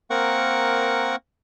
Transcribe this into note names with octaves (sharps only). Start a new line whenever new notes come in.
A#3 C4 A#4 F#5 C#6